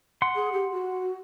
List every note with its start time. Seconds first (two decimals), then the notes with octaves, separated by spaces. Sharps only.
0.22 F#5 C6
0.35 G#4
0.53 G4
0.72 F#4